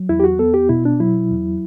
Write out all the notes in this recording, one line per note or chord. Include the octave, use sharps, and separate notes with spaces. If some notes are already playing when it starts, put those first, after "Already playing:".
Already playing: F#3
E2 E4
G4
F#4
B3 A4
G4
B2 E4
D4
F#3 E4
E2